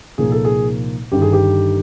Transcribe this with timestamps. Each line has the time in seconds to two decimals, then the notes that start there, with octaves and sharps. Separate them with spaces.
0.18 C2 A#2 F3 A#3 D#4 G#4
0.32 A4
0.45 G#4
1.12 G1 G2 D#3 G4
1.22 G#4
1.33 G4